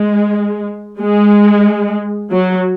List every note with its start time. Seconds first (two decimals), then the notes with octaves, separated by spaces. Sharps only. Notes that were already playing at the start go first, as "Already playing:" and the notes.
Already playing: G#3
1.01 G#3
2.33 F#3